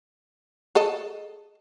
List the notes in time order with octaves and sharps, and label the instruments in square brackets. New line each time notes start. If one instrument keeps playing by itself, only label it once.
[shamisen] G#4 A4 D#5